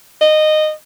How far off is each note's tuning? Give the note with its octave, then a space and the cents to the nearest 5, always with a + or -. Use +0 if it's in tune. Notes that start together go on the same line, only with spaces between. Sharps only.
D#5 -15